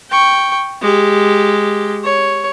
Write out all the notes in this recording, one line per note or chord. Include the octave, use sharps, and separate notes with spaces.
G5 C#6
G#3 G4
C#5